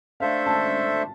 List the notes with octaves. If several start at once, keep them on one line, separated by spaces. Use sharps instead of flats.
A3 D4 A4 C5 E5 F5
A5